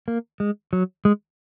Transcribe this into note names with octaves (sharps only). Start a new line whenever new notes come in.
A#3
G#3
F#3
G#3